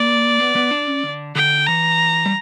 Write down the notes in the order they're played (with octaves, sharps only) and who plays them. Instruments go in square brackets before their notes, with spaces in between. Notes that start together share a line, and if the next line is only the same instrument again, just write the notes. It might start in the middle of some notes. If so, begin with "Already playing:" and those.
Already playing: [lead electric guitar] A#3 [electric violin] D5
[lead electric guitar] B3
B3
D4
C#4
D3
[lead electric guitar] D3 [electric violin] G5
[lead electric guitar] E3 [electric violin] A#5
[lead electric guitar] G3